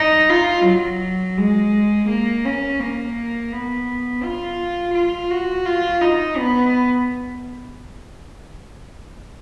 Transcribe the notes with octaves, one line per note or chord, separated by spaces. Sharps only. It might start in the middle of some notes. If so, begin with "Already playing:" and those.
Already playing: D#4
F4
F#3
G#3
A#3
C#4
A#3
B3
F4
F4
F#4
F4
D#4
B3